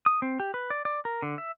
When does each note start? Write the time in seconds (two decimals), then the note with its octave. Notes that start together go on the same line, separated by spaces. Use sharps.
0.06 D#6
0.22 C4
0.40 G4
0.54 B4
0.70 D5
0.85 D5
1.05 A#4
1.22 D3
1.38 E5